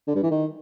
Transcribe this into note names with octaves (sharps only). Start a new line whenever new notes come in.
D3
G2
E3
D#3